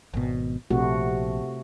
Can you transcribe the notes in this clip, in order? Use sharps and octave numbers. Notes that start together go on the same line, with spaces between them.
G#1 B2
A#1 C3 A3 F#4